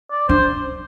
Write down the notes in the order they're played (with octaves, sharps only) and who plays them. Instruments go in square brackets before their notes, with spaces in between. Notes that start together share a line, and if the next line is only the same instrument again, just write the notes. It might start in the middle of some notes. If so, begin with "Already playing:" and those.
[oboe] D5
[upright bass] D4 [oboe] C5